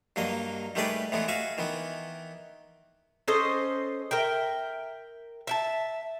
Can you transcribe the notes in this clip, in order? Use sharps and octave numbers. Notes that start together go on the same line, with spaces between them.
G2 F#3 A#3 D#5
D#3 G3 A3 G#4 B4 D5
A2 E3 G#3 B3
F#4 E5 F5 G#5
D#3 E3 B3
C#4 A4 C5 D#5
A#4 E5 G5
E5 G5 A5